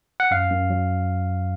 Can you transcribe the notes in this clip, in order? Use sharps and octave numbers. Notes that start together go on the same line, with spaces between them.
F#5
F#2 F5
F#2
F#3